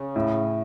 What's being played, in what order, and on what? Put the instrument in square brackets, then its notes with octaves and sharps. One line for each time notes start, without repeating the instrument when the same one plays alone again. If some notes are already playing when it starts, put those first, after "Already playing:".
Already playing: [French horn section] C#3
[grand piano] A2